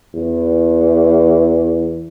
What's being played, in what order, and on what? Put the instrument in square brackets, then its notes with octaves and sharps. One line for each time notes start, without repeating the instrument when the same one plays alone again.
[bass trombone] E2